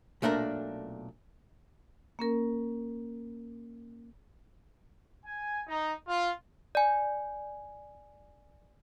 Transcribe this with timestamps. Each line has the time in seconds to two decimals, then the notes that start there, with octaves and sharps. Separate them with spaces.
0.22 B1 A#2 A3 D4 A#4
2.19 A#3 C#4 A#4
5.25 G#5
5.68 D#4
6.08 F4
6.75 D5 G#5